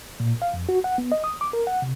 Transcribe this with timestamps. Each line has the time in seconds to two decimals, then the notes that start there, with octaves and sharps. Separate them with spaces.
0.20 A#2
0.42 F5
0.54 F2
0.69 F#4
0.84 F#5
0.98 B3
1.12 D#5
1.24 D#6
1.41 D6
1.53 A#4
1.67 F#5
1.82 C3